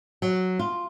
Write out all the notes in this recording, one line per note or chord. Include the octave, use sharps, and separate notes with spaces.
F#3
F4